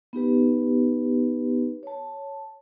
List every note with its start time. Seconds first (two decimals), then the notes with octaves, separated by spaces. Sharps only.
0.13 B3 D#4 G4 B4
1.83 C#5 A5